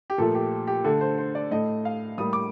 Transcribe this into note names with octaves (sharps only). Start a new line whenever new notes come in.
G4
A#2 F3 A3 A4
G4
G4
D3 A3 A4
C5
C5
D5
A2 A3 D#5
F5
A2 G3 A#3 D#6
D6